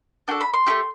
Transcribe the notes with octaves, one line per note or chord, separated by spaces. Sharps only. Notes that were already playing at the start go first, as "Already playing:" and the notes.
D4 F#4 A4 G5
B5
C6
A3 E4 G4